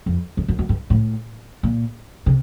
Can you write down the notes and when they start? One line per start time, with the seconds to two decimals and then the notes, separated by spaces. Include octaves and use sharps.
0.06 F2
0.37 F2
0.48 F#2
0.59 F#2
0.69 G2
0.90 A2
1.63 A#2
2.26 C3